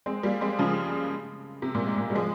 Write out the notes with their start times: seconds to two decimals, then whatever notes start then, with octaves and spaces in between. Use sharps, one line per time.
0.06 G#3 C4
0.23 G3 A#3
0.41 G#3 C4
0.59 C#3 F3
1.62 C3
1.75 A#2
1.86 G#2
1.98 A#2
2.10 G3
2.15 F3 G#3